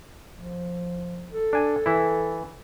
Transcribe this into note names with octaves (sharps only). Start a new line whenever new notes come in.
F3
A4
D4 G#5
E3 E4